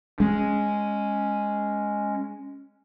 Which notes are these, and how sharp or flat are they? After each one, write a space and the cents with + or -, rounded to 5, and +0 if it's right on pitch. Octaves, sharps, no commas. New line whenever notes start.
G#3 +0 C#4 +0